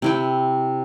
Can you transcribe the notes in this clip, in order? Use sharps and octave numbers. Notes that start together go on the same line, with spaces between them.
C3 E4 G5